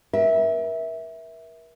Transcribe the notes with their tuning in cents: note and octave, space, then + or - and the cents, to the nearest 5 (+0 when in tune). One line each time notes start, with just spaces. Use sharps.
A#4 +40 E5 -10